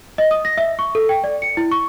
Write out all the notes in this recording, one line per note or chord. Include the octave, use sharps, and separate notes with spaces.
D#5
D#6
A#6
E5
C#6
A4
G5
D5
C#7
E4
C#6